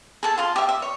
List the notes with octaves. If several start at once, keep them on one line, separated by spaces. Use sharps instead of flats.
G#4 A4 A5
F4 F5 C6
G4 E5
E5
C#5